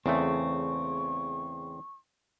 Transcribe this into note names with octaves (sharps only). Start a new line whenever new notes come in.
E2 C#3 A3 C4 C#6